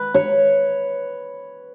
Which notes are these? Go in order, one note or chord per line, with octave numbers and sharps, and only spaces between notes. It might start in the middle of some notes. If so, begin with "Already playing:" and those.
Already playing: B4
C#5